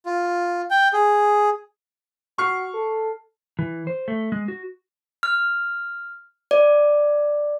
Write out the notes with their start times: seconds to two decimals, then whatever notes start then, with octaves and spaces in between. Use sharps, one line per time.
0.06 F4
0.71 G5
0.93 G#4
2.38 F#4 C#6 F6 C7
2.74 A4
3.59 E3
3.87 C5
4.08 A3
4.32 G#3
4.48 F#4
5.23 F6
6.51 D5